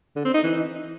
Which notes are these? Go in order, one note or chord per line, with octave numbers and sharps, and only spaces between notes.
D3
C4
D#4
E3